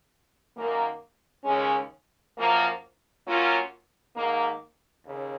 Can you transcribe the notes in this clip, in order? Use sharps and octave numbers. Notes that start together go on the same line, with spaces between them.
F#2 D#3 A#3
D#2 C#3 G#3 C#4
F#2 F3 A#3
F#3 A#3 C#4 F4
G#2 D#3 A#3
D#2 C#3